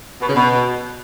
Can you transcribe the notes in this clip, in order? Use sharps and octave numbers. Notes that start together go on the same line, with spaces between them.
B2
C#3
B2